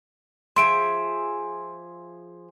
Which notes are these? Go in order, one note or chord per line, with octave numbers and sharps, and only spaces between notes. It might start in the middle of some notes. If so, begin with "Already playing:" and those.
F3 G#4 E5 C6 D7